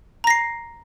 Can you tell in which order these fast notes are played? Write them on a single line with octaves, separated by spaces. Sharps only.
A#5 A#6 C7